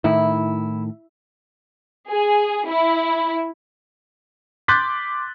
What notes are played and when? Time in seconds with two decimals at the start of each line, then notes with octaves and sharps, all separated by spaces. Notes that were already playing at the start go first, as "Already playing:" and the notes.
0.04 A2 D#3 E4
2.10 G#4
2.69 E4
4.68 C6 D6 F#6 G6 A6 B6